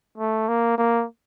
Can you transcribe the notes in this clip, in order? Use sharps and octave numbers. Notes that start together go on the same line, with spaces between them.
A3
A#3
A#3